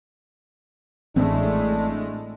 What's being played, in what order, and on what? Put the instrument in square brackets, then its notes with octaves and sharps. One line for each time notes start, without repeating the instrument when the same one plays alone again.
[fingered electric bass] A1 C4 [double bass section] A2 G#3 A3 [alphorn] D4